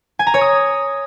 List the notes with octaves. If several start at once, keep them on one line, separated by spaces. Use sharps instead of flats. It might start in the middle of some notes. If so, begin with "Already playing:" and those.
G#5
A#5
C#5
D#6